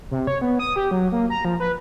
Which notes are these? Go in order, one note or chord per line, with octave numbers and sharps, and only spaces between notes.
C3
C#5
B3
D#6
G4
F#3
A#3
A#5
F3
B4